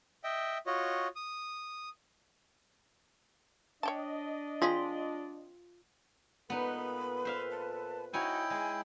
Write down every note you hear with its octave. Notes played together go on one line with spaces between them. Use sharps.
D#5 E5 G5
F4 F#4 C#5 D#5
D#6
D4 C#5 D#5 G5 A5
C4 F4 G#4 F5 C6
A#2 B3 D#4 A4 B4 B5
C5 E5 F5
A5
D#4 E4 F#4 C#5 G5 G#5
G#3 G#5